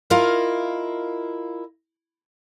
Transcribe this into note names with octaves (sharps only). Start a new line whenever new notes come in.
E4 F4 A#4 D#5 F5